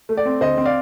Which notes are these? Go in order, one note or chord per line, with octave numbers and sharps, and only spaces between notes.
A3
D5
C4
D2 C5 D#5
C4
D5 F5